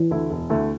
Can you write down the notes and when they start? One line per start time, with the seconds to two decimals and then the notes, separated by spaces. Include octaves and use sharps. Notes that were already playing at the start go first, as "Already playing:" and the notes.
Already playing: E3
0.11 D2 D3 A3 E4
0.30 E1
0.50 D2 D3 A3 E4